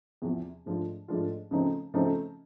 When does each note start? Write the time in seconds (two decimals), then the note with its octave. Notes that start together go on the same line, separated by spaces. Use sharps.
0.22 E2 C3 F3
0.66 G#2 F3 A3 D4 F4
1.08 G#2 F3 A3 D4 F4
1.51 C#3 F3 A3 C4 D#4
1.94 C#3 F3 A3 C4 D#4